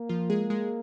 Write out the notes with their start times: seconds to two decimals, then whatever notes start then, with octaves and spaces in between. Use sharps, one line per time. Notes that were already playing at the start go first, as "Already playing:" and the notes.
Already playing: A#3
0.09 F3 F4
0.30 G#3 G#4
0.50 G#3 G#4